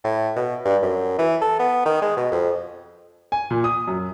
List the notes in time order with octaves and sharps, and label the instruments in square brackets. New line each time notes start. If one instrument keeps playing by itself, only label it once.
[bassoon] A2
B2
G2
F#2
E3
A4
B3
D#3
G#3
B2
F2
[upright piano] G#5
A#2
D#6
F#2